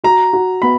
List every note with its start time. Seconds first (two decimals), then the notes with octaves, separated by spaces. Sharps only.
0.04 F#4 A#5
0.33 F#4
0.62 B3 B5